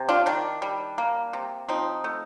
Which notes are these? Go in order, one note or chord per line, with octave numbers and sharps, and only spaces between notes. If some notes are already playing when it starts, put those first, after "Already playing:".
Already playing: C3
D4 F4
D#3 D4
G3
A#3
C3
F3 C4 D#4
A3